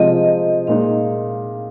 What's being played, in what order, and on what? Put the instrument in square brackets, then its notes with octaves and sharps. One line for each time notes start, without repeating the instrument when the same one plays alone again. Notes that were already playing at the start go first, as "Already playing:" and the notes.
Already playing: [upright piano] C3 F3 G#3 C4 F4 [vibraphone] D#5
[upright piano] A#2 G#3 D#4 [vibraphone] F5